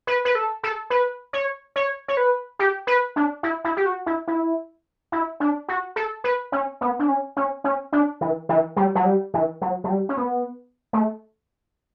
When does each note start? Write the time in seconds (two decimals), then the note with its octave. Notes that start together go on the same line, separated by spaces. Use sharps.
0.07 B4
0.25 B4
0.35 A4
0.63 A4
0.90 B4
1.33 C#5
1.76 C#5
2.08 C#5
2.17 B4
2.59 G4
2.87 B4
3.16 D4
3.43 E4
3.64 E4
3.77 G4
3.86 F#4
4.06 E4
4.28 E4
5.12 E4
5.40 D4
5.69 F#4
5.96 A4
6.24 B4
6.52 C#4
6.81 B3
6.99 D4
7.08 C#4
7.37 C#4
7.64 C#4
7.93 D4
8.21 E3
8.49 E3
8.76 G3
8.95 F#3
9.05 G3
9.34 E3
9.62 F#3
9.84 F#3
9.90 G3
10.09 C#4
10.17 B3
10.93 A3